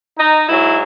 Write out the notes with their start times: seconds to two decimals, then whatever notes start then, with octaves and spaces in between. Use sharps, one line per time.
0.18 D#4
0.48 G#2 F#3 E4